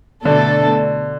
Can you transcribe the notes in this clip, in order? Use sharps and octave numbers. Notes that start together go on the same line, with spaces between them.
B2 D3 A3 D4 A4